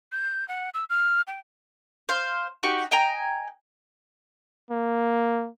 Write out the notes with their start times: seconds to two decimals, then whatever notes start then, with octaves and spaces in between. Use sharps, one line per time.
0.12 G6
0.48 F#5
0.74 E6
0.90 F6
1.27 G5
2.09 C5 F5
2.63 D#4 F#4 G4 C#6
2.91 D#5 G5 G#5 A#5
4.71 A#3